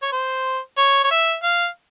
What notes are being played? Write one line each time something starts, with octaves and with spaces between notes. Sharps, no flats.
C#5
C5
C#5
C#5
E5
F5